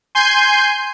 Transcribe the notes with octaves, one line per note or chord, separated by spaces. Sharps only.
G#5 C6 G6